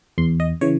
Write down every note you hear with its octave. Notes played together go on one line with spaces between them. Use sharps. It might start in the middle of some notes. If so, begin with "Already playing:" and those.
E2 C6
D#5
C#3 E3 C#5